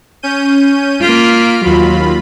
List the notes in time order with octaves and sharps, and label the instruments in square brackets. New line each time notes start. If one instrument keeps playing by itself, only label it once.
[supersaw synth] C#4 G6 D#7
[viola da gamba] A#3 F4 [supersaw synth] F6 B6 D7
[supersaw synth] D#2 F4 B5 [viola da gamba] F#3